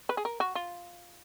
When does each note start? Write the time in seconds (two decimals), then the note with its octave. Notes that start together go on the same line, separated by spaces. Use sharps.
0.09 B4
0.17 G#4
0.25 A#4
0.40 F#4
0.55 F4